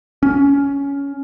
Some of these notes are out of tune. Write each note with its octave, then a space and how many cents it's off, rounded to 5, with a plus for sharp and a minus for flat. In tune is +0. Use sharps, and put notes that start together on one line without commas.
C#4 +15